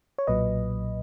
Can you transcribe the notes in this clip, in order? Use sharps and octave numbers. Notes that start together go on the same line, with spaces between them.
C#5
B1 A#2 F#3 B4 D#5